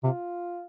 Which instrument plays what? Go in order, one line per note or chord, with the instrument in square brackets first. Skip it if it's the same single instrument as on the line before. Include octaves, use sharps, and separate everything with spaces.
[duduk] C3 [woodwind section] F4